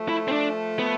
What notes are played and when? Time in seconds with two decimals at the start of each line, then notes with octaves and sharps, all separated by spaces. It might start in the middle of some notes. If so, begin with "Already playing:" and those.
Already playing: F3 A3
0.09 E4
0.28 C4
0.32 D4
0.79 B3